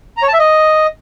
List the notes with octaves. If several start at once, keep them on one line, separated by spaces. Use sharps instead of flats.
A#5
C#5
A5
E5
D#5